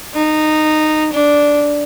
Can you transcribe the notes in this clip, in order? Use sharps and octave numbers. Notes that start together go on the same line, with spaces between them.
D#4
D4